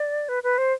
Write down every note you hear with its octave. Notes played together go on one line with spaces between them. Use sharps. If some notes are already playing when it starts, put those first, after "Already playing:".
Already playing: D5
B4
B4
C5